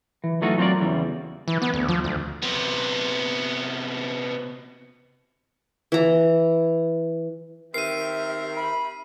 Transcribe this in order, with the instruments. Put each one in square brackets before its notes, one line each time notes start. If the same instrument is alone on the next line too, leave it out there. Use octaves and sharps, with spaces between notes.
[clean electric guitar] E3
E3 F#3 A3 D#4 F4 F#4
F#3 C4 F4 A#4 D5
E2 C#3 E3 G3
[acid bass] E3
B3
D2
F3
D2
[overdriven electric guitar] C3 B3
[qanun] E3 A#5
[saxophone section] D#3 C4 A#4 [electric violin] G4 E5 [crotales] C7 D#7
[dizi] B5